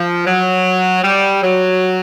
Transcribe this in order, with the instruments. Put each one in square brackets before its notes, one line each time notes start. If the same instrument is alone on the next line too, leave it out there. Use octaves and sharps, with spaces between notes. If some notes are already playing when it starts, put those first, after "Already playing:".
Already playing: [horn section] F3
F#3
G3
F#3